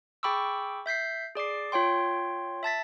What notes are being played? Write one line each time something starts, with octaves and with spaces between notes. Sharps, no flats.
G#4 G5 B5 C#6 D6 E6
E5 G6 B6 C7
G#4 D5 D6 C7
F4 C#5 G5 C6
E5 A5 A6 B6